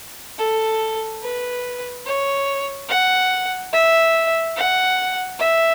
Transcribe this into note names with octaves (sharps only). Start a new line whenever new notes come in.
A4
B4
C#5
F#5
E5
F#5
E5